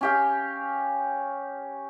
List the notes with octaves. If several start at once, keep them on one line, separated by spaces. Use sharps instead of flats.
C#4 G4 F5